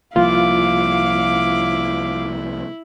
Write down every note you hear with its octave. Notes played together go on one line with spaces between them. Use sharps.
C2 F3 A#3 E4 F4 F5 D6